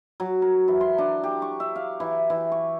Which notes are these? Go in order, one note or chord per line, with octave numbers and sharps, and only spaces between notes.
F#3
A#4
E3
C6
D4
G4
C#6
E5
F5
E3
E3
C#6